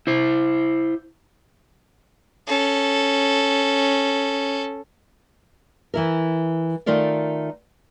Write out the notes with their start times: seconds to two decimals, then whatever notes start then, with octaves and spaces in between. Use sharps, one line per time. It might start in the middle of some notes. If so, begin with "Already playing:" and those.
0.07 E4 C5
2.47 C#4 A4
5.94 E3 E4 A#4
6.86 D#3 A3 D#4 F4 A#4 D5